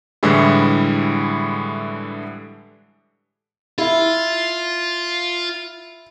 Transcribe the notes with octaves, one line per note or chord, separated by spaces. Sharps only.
A2 D3 E3 G3 G#3 E4
E4 F4